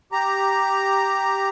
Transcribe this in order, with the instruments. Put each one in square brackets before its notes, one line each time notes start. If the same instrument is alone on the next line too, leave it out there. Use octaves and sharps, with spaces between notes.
[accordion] G4 A#5